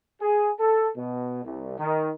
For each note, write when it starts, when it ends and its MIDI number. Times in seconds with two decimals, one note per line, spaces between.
0.21 0.51 68
0.59 0.88 69
0.96 1.41 47
1.43 1.74 36
1.78 2.10 51